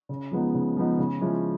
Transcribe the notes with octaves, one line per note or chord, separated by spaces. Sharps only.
C#3
F3 G#3 B3 D#4
C#3
F3 G#3 B3 D#4
C#3
F3 G#3 C#4 E4